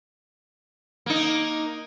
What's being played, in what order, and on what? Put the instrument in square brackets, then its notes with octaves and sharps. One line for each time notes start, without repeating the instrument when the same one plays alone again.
[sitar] A#3 D#4